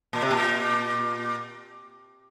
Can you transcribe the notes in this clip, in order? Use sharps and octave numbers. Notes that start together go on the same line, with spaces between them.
A#2
C3
A#2